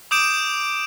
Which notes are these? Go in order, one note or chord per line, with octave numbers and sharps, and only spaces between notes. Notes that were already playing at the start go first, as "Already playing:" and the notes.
D6 D#6 G6 D7 E7